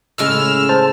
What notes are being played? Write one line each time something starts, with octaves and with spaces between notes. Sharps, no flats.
A2 C#3 G#3 E6 F6
C5 A5